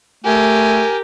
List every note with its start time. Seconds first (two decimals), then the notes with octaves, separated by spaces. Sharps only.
0.25 A3 G4 A#4 G#5